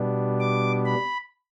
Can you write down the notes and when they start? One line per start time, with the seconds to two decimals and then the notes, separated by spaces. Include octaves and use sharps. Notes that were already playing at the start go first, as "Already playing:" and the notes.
Already playing: B2 G3 B3 D4
0.40 D6
0.86 B5